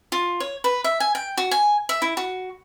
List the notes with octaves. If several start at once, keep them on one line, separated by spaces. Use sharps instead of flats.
F4
C#5
B4
E5
G#5
G5
F#4
G#5
E5
E4
F#4